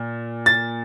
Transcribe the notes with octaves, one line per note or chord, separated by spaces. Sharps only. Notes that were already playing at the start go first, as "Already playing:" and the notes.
Already playing: A#2
A6